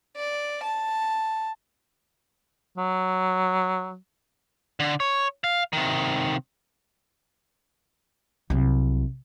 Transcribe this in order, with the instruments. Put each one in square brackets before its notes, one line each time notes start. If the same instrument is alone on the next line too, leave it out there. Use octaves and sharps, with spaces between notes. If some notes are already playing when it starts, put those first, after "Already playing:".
[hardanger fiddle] D5
A5
[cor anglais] F#3
[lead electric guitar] D3
C#5
F5
C3 D#3
[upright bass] C2 F#3